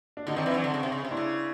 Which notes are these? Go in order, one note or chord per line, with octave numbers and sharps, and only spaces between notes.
D4
D3 D#4
D#3 C4 D4
E3
F#3
D3
C#3
C3
C#3
C3
D4 E4
C#3